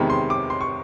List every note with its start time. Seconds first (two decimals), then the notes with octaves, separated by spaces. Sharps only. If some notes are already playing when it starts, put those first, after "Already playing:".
Already playing: E2 C3 D#3 G#3 B5
0.10 C6
0.30 D6
0.50 C6
0.61 C#6